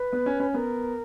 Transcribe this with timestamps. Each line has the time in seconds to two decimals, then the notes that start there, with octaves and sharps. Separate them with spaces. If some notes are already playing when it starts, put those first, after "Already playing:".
Already playing: B4
0.13 B3
0.26 C#4
0.40 C#4
0.53 B3 A#4